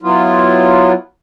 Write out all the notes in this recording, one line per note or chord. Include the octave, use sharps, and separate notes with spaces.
F#3 B3 E4 F4